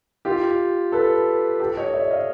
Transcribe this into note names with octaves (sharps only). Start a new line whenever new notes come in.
F4 G4
A4 B4
G4 A4
C#5 D#5
D5 E5
D#5 F5